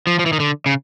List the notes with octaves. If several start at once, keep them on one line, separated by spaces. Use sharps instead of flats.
F3
F3
E3
D#3
D3
C#3